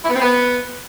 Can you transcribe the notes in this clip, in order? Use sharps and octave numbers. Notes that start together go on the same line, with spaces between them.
E4
B3
C4
B3